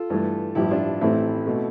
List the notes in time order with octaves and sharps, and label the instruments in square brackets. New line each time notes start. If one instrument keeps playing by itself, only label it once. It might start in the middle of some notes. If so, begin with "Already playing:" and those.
Already playing: [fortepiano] F4 A4
G2 E3 A3
A1 G2 F3 E4 G4
D4 F4
A1 A2 E3 A3 C4 E4
B2 A3